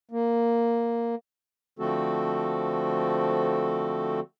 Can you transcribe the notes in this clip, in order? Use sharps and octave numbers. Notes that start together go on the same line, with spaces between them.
A#3
D3 F3 A3 C4 F#4 A4